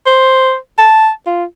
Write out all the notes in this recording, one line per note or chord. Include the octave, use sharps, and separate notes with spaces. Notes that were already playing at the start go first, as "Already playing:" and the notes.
C5
A5
F4